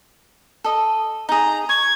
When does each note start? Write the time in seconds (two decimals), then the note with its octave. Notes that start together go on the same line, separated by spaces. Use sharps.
0.64 A4 D#5
1.29 D#4 G#4 A#5
1.69 C#6 G#6